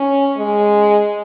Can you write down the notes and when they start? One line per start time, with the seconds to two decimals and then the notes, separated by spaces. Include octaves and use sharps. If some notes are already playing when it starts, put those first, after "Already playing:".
Already playing: C#4
0.37 G#3